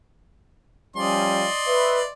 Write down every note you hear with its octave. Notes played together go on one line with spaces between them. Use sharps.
F3 G3 C#4 D5 D#5 C6
B4 E5